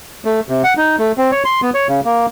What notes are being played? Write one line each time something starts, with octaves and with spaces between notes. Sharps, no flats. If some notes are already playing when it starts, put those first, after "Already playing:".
A3
C3
F#5
D#4
A3
C4
C#5
C6
B3
C#5
C#3
A#3